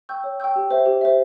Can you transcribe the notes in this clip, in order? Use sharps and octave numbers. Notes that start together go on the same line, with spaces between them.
G5 C#6 E6 G6
C#5
G5 C#6 E6 G6
G4
C5 E5
G4
C5 E5